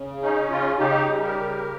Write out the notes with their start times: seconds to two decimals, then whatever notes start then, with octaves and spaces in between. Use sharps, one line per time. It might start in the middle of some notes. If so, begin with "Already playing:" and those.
Already playing: C#3
0.22 C#4 D#4
0.50 C#3 F4
0.79 C#3 D#4 G4
1.08 G3
1.22 G4 A#4
1.36 C#3